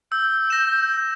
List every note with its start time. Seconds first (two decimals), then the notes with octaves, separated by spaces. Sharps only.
0.12 E6 G6
0.50 A#6 E7